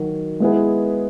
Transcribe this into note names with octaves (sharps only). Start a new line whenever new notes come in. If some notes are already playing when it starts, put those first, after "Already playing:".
Already playing: D#3 F#3
G#3 B3 E4 G#4 B4